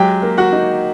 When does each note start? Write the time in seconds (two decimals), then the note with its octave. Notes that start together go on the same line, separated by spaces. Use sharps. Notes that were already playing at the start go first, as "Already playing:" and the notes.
Already playing: F#3 G#3 G4 G5
0.23 A#3
0.38 F#4 F#5
0.53 D#4